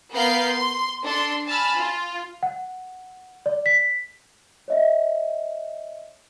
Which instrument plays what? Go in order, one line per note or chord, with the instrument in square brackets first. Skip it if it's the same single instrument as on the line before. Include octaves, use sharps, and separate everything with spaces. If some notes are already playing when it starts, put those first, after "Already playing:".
[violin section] B3 A#4 B4 F5 G6 C7
C6
D4 A4 C6
G#5 A5 B5 E6 F6
F4
[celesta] F#5
D5
B6
C#5 D#5 E5